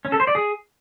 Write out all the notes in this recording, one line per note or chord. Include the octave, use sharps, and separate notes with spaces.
C#4
A4
C5
D5
G#4